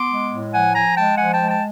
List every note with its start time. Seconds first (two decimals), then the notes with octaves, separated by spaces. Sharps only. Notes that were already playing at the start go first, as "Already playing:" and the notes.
Already playing: B3 C6 D6
0.11 G#3
0.32 A2
0.53 F3 F#5 G#5
0.75 F3 G#5 A#5
0.95 G#3 G5 A5
1.16 F3 F#5 G#5
1.32 G5 A5
1.38 G#3
1.48 G5 A5